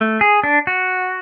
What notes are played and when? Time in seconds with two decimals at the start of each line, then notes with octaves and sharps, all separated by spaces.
0.01 A3
0.21 G#4
0.44 D4
0.67 F#4